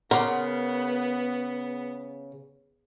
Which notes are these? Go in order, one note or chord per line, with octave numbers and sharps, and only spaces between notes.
C#3 B3 A#4 F#5 C6 D6